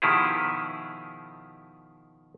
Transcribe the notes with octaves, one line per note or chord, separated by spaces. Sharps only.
B2 D#3 F3 E4 G4 G#4